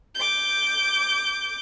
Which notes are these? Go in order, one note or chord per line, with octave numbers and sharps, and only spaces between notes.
D6 G6